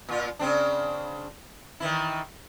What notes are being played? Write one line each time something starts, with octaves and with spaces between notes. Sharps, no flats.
A#2 F4
C#3 C4 D4
D#3 E3 E4